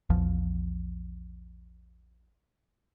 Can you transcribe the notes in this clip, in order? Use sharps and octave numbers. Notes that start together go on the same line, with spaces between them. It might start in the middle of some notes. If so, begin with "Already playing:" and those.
A#1 E2 F3